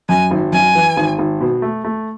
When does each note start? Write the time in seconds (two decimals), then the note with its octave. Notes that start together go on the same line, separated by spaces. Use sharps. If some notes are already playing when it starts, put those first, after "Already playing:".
0.09 F#2 G#5
0.31 G#1
0.52 F#2 G#5
0.75 E3
0.97 G#1
1.18 G#1
1.41 B2
1.62 A3
1.84 A3